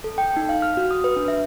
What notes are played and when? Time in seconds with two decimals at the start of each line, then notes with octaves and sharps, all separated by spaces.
0.04 A4
0.18 G5
0.37 D#4
0.49 F5
0.62 F6
0.77 F#4
0.91 D#6
1.04 B4
1.16 D4
1.28 E5